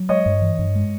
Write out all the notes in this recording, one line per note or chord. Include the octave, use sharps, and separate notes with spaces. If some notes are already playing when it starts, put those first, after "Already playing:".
Already playing: F#3
G#3 C#5 D#5
G2
E3
G2
G#3